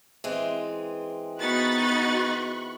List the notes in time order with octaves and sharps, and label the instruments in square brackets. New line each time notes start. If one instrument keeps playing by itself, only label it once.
[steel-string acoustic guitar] E3 G#3 C4
[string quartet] B3 D#4 A6 [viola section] F#4 [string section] B5 C#6 F#6